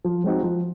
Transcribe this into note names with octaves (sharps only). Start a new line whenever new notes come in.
F3
G#3 C4 D#4 F#4
F3